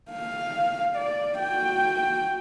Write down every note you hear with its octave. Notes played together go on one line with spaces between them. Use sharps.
F5
D5
F#4 G5